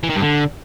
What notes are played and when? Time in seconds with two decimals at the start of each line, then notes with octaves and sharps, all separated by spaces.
0.03 E3
0.10 D#3
0.16 G2
0.22 D3